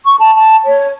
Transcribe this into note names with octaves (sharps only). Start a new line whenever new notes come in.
C#6
A5
A5
C#5